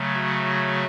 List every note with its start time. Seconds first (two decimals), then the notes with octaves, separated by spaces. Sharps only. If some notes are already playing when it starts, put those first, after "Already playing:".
Already playing: C#3 F#3 A3
0.13 F#4